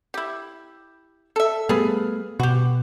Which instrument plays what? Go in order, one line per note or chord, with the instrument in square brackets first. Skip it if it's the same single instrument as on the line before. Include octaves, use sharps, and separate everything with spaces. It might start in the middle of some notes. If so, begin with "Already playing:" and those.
[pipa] E4 G4
A4 E5
[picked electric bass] G3 A3 B3 [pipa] G#4 B4 F5
[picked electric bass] B2 [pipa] F#4 G4